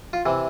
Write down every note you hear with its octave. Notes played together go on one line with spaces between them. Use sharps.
F4
C3 E3